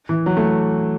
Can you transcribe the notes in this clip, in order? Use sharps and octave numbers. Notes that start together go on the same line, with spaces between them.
E3
F#3
A3